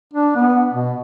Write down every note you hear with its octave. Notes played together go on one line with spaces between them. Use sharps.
D4
B3
B2